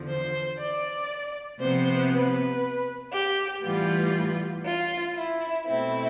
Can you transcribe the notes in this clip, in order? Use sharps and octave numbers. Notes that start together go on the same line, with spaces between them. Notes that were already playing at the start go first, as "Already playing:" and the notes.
Already playing: E2 D3 F3
C5
D5
C3 F3 B3 C5
B4
G4
A2 E3 G3 B3 F4
F4
E4
B2 A3 C4 E4